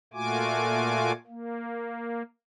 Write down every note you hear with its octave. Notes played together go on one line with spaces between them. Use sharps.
A#2 A3 F4 F#4 G#5 D6
A#3